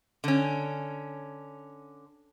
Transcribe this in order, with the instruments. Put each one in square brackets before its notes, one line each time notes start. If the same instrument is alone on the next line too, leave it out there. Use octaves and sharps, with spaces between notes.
[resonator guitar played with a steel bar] D3 C#4